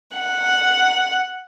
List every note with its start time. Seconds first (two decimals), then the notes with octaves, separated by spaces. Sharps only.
0.18 F#5